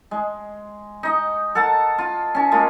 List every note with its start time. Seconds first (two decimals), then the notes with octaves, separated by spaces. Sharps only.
0.11 G#3
1.03 D#4 D#5
1.55 A4 A#4 F#5 A5
1.98 F4
2.35 C#4 A5
2.51 G#3 A#3 F4